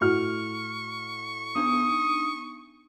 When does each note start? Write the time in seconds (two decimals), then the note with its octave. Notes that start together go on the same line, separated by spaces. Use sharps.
0.01 A2 F#4 C#6 F6
1.56 B3 D4 D#4 D#6